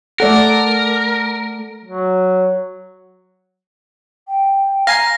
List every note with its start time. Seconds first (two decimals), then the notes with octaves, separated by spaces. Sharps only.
0.20 A3 A4 A#4 D5 F#5
1.85 F#3
4.27 G5
4.87 F5 G#5 A#5 A#6 C7